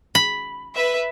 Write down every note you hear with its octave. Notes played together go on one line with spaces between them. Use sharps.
B5
B4 E5